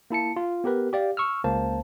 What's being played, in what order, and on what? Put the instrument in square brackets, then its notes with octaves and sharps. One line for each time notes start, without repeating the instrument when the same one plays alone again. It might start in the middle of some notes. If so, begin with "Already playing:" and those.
[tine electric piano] A#3 E4 A5 C#7
F4
B3 G4 A#4 B4
G4 D5 F5
C#6 E6 F6
C#2 A#3 C5 A5